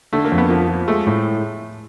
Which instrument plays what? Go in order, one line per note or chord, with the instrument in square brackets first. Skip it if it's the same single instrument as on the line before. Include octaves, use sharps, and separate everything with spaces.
[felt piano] D3 [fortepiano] A3
[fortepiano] A#3
[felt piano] F2
[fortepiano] B3
[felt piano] F3 [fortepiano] A#3
[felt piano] F3
[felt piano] G#3 [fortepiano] A3
[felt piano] A2